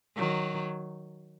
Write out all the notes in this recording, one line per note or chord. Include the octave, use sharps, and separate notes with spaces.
D#3 F#3